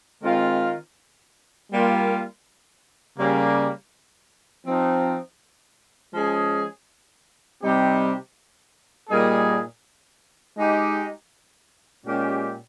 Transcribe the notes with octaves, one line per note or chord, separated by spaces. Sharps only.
D#3 G#3 C4 F4
G3 A#3 F4
C#3 G3 A#3
F3 C4 D#4
F3 G#3 C#4 G#4
C3 G3 C4 D#4 G4
A#2 G3 A#3 D#4 G#4
G#3 D#4 G4
A#2 G#3 C#4 G4